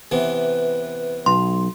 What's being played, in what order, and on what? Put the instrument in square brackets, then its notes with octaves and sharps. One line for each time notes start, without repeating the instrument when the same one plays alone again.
[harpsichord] C3 E3 B3 [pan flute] B4
[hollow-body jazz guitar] B1 [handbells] C6